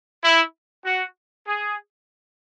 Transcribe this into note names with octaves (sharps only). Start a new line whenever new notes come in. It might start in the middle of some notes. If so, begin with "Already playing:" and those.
E4
F#4
G#4